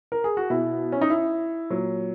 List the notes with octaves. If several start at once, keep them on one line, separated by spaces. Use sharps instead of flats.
A#4
G#4
F#4
B2 E4
C#4
D#4
E4
A#2 F#3